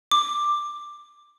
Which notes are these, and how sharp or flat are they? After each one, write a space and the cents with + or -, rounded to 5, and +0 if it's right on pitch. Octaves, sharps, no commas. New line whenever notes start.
D6 +10